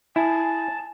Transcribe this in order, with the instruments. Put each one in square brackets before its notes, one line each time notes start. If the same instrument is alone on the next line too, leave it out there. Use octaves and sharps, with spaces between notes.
[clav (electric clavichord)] E4 [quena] G#5 [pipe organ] A5